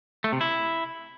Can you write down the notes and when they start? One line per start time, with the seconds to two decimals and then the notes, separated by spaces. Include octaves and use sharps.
0.24 A3
0.32 C3
0.41 E4